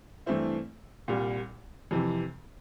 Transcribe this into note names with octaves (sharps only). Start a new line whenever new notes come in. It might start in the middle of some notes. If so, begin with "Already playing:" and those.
G2 E3 A3 C4 E4
C2 A#2 G3
F2 C3 E3